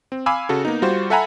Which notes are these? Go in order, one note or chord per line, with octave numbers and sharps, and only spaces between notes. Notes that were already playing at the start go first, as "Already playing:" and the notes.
C4
F5 G#5 B5 D6 E6
C#3 F#4 A4
A#3 B3 D#4
G3 F4 F#4 C5
A4 E5 F#5 G#5 A#5 B5